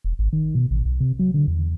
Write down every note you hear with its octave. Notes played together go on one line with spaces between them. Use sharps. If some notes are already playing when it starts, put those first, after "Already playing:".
E1
G#1
D#3
B2
A1
B1
C3
F#3
D3
E2